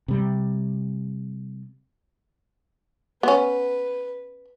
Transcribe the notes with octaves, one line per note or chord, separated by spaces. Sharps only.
C3 G3
B3 C#4 B4